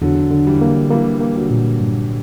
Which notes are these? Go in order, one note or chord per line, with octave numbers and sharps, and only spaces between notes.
E2 D3 F#3
D3
E3 G3
A#3
E3 G3 A#3
A#3
D3 F#3
A#2
G2